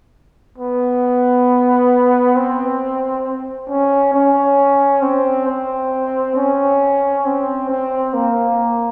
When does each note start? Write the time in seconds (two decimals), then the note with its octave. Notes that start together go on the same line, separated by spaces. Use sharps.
0.58 B3
2.36 C4
3.69 C#4
4.14 C#4
5.02 C4
5.48 C4
6.36 C#4
7.25 C4
7.69 C4
8.14 A#3